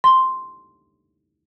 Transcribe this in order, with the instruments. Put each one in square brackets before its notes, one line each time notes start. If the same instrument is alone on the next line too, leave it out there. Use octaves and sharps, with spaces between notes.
[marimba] C6